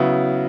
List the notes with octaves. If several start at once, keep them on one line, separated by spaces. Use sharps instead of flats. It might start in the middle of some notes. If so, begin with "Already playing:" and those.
Already playing: C#3 F#3 B3 E4